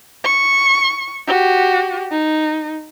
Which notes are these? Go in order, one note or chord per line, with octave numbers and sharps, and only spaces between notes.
C#6
F#4 G4
D#4